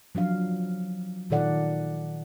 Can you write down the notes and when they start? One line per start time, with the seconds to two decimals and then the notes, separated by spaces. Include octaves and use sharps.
0.15 F3 F#3 D4 F5
1.30 A#2 D#3 F4 A4 D5 F#5